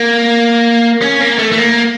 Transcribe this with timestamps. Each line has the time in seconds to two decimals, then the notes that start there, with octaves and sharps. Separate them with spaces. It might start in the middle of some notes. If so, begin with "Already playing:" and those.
Already playing: A#3
1.02 C#4
1.21 A#3
1.39 A3
1.52 A3
1.58 A#3